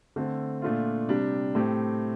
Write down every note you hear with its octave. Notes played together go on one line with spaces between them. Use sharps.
D3 A3 C4
A#2 A3 D4 F4
C3 G3 D4 G4
A2 A3 C4 G4